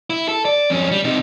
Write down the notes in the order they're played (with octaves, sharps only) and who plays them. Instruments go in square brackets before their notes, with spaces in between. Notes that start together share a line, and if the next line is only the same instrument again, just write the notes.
[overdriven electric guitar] E4
A4
D5
F2 C#4
G3
C3 D#4